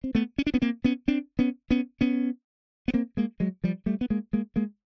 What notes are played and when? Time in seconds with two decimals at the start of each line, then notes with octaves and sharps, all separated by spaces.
0.04 C4
0.15 A3 B3
0.38 C#4
0.47 D4
0.54 B3 C#4
0.62 A#3 C4
0.84 B3 C#4
1.08 C4 D4
1.39 B3 C#4
1.71 B3 C#4
2.01 B3 C#4
2.88 B3
2.94 A#3 C4
3.17 G#3 A#3
3.40 F#3 G#3
3.64 F3 G3
3.86 G3 A3
4.01 B3
4.10 G#3 A#3
4.33 G#3 A#3
4.56 G#3 A#3